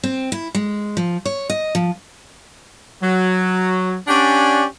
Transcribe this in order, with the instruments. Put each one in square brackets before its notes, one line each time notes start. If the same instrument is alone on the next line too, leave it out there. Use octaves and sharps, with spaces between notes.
[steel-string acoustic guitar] C4
E4
G#3
F3
C#5
D#5
F3
[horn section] F#3
C#4 D4 G4 D5 F#5 G#5